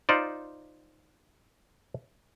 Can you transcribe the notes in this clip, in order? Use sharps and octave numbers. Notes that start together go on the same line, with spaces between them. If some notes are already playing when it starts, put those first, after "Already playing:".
D#4 F4 C5 D5